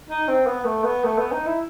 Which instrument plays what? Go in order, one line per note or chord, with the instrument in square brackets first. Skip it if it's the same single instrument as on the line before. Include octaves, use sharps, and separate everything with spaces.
[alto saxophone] D#4
C4
B3
A3
B3
A3
B3
D#4
E4